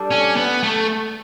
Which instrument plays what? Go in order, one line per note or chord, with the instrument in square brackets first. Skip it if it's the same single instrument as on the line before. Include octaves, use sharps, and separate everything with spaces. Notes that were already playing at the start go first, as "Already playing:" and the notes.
Already playing: [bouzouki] G3 D4 A4
[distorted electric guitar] C#4
B3
A3